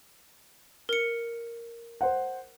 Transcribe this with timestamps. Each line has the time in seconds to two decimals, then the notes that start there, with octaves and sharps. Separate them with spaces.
0.89 A#4 C#7
2.01 C5 F#5